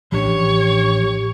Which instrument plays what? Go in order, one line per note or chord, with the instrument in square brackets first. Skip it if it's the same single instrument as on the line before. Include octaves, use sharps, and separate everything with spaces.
[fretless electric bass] A1 [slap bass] F3 D4 [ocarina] G4 [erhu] C#5